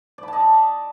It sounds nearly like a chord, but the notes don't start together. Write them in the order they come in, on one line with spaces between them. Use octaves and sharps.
D5 B5 A5 D#5